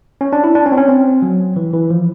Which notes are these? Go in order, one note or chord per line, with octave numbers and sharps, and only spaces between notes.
C#4
D4
E4
D4
C#4
C4
C#4
C4
F#3
E3
E3
F3